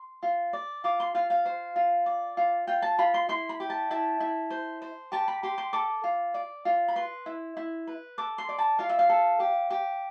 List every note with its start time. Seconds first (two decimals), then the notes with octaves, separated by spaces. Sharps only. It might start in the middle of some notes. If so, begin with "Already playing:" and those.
Already playing: C6
0.23 F4
0.53 D5
0.84 F4 D6
1.00 C6
1.14 F4 F5
1.30 F5
1.45 C5
1.76 F4
2.06 D5
2.37 F4
2.67 F4 G5
2.82 A5
2.98 F4 B5
3.14 C6
3.29 E4 C6
3.49 B5
3.60 G4
3.70 A5
3.90 E4 A5
4.20 E4
4.50 C5
4.82 C5
5.12 G4 A5
5.28 B5
5.43 G4 C6
5.58 C6
5.73 A4 D6
6.04 F4
6.34 D5
6.65 F4
6.88 B5
6.95 B4 C6
7.26 E4
7.57 E4
7.87 B4
8.18 A4 D6
8.38 C6
8.49 D5
8.58 A5
8.79 F4 F5
8.89 E5
8.99 F5
9.09 A4
9.40 G4
9.70 G4